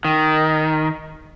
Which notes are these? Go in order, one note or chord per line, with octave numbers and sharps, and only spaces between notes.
D#3